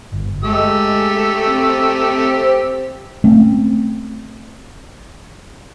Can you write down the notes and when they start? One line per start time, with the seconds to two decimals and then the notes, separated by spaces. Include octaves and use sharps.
0.12 G1
0.44 G#3 A3 G4 E6
1.46 C4
3.24 A3 C4 C#4